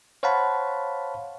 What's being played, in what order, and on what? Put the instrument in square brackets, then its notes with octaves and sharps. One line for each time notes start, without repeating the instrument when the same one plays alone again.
[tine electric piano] C5 C#5 F5 F#5 A5 B5